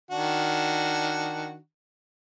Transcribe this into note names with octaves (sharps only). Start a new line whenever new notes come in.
D#3 D4 F#4